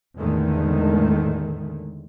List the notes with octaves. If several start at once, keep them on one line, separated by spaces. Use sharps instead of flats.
E2 A2 D3 D#3 G#3 A3